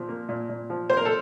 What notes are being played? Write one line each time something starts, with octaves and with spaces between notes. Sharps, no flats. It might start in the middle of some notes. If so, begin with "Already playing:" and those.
Already playing: A#2 F3
A#3
A#2
A#2
F3
A#3 C5
A#4
A4